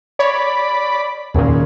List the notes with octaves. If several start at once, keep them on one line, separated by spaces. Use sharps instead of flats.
C#5 D5 B5
D#2 A#2 C#3 G#3